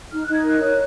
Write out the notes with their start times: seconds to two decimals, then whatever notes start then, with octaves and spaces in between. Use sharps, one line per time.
0.11 D#4 F6
0.23 D#4 F#6
0.33 G#6
0.44 A#4 F#6
0.61 C#5